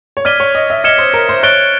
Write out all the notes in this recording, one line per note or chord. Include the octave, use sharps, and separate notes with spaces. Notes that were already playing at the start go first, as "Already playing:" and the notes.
C#5
D5 F6 G#6 B6 D#7 G7
C#5
D#5
E5
D#5 F6 G#6 C#7 E7 G7
C5
A#4
C5
C#5 F#6 A6 D7 G7